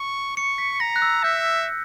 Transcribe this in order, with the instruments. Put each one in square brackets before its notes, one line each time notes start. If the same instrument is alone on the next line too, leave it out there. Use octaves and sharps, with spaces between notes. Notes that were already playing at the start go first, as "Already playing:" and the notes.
Already playing: [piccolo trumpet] C#6
[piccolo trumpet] C#6 [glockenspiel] C#7
[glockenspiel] B6
[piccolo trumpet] A#5 [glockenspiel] A#6
[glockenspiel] F#6
E6
[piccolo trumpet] E5 [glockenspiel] G6